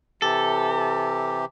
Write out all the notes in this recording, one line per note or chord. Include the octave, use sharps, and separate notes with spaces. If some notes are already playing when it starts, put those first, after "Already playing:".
C3 E3 G4 A4